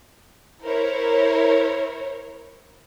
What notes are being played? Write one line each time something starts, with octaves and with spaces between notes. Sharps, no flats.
E4 A#4 C5 C#5